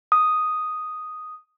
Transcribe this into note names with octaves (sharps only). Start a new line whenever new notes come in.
D#6